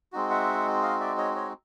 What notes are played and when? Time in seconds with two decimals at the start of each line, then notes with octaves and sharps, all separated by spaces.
0.13 G#3 C4 D#4 F#4
0.30 E5 F#5
0.82 D#5 F5
1.00 D5 E5
1.18 C#5 D#5
1.35 C#5 D#5